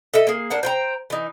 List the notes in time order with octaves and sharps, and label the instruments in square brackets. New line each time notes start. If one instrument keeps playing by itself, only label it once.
[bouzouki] A4 D#5 E5
A#3 G#4
A#3 D4 F#5
C5 G5 A#5
E3 D#4